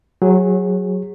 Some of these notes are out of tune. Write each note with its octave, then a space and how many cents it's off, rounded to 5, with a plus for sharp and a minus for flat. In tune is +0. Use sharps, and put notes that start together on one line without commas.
F#3 +0 G#4 -20 C#5 -30